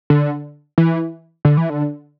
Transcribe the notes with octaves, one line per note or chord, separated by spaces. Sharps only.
D3
E3
D3
E3
D3